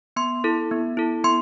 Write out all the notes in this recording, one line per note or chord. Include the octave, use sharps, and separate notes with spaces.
B3 C6
E4 A4
B3
E4 A4
B3 C6